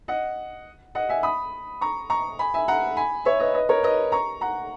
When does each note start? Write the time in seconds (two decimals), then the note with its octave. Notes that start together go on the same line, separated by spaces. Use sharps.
0.08 D#5 F#5
0.95 D#5 F#5
1.09 E5 G#5
1.23 B5 D#6
1.81 A#5 C#6
2.10 A#5 C#6
2.39 G#5 B5
2.54 E5 G#5
2.68 F#5 A#5
2.97 G#5 B5
3.25 C#5 E5
3.40 B4 D#5
3.54 B4 D#5
3.69 A#4 C#5
3.83 B4 D#5
4.12 A#5 C#6
4.41 F#5 A#5